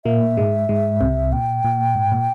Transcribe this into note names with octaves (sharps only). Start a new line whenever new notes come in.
A#2 A#3 E5
G#2 G#3
G#2 G#3
C2 C3
A#2 G5
A#2
G#2
A#2